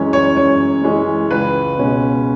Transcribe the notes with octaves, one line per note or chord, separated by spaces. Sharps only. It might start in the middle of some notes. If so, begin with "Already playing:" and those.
Already playing: F#2 E3 G#3 C#4 C#5
C#5
F#2 C#5
E3 G#3 C#4
C#2 B4
B2 G#3 C#4